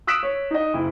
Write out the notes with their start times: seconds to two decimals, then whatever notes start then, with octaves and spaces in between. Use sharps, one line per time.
0.07 D#6 E6 F#6 B6 D7 E7
0.23 C#5
0.51 D#4 D#5
0.74 F#1 E4